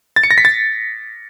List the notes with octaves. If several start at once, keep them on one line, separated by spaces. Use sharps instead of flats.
A6
C#7
A#6
B6
A6